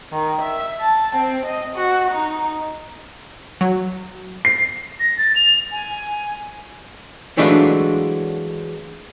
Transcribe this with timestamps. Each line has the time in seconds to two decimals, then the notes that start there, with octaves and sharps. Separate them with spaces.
0.12 D#3
0.42 E5
0.81 A5
1.16 C4
1.46 D#5
1.76 F#4
2.11 D#4
3.61 F#3
4.45 C7
5.00 A#6
5.18 A6
5.36 F7
5.72 G#5
7.37 E3 F#3 G#3 A3 D4 F4